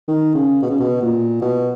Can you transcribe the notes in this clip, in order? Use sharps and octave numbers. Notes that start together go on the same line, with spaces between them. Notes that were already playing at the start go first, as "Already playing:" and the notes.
D#3
C#3
B2
C#3
B2
A#2
B2